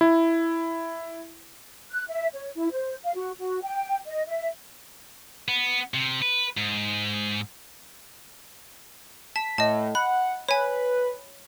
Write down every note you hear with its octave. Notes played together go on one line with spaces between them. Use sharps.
E4
F#6
E5
C#5
E4
C5
F5
F#4
F#4
G5
D#5
E5
B3
C3
B4
G#2
A5 B6
A2 D#5 A5
F#5 B5
B4 C#5 G#5